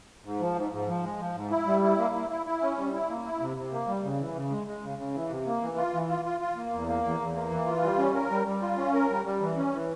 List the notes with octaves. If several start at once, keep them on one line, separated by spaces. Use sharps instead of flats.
G#2
F3
G#2
G#2
F3
G#3
F3
G#2
E4
G3
E4
A#3
E4
E4
E4
C#4
G3
E4
A#3
E4
C3
C3
A#3
G3
C#3
E3
C#3
G#3
G#3
C#3
C#3
E3
C3
A#3
E3
F4
E3
F4
F4
F4
A#3
E2
A#3
E2
E2
A#3
E3
F4
G3
C#4
A#4
G3
G3
F4
C#4
A#4
G3
G3
E3
C#4
E3